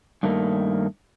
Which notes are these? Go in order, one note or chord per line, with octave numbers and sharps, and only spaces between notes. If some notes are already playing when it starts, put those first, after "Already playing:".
G2 D#3 A3 A#3